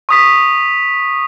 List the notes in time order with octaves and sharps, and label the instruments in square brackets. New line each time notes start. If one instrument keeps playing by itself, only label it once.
[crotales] C#6 D#6 B6